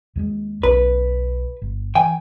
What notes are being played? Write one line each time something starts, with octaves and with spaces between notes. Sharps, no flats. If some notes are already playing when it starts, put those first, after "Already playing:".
D#2 G3 G#3
B1 C#4 B4
G1
E3 G5 G#5